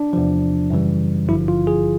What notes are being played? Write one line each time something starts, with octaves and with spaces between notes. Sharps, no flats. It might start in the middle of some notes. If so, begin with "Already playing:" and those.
Already playing: D4
E2 C3 F3
F#2 C#3 E3 G3
G#1 G2 D3 F3 E4
F4
G#4